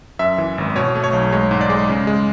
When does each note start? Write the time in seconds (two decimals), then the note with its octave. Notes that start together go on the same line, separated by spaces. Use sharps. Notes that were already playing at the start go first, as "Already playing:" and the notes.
0.19 F#2 E5
0.38 E3
0.58 G#1
0.75 B2 C#5
0.95 A3
1.04 C#5
1.13 B1
1.32 G#3 C#5
1.51 G#2
1.61 D5
1.70 G#3
1.89 C#3
2.07 G#3